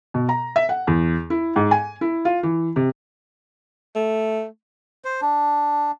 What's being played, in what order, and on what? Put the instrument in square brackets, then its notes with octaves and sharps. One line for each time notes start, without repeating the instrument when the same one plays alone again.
[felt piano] B2
A#5
E5
F#5
E2
E4
G#2
G#5
E4
F4
E3
C3
[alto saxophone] A3
[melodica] C5
D4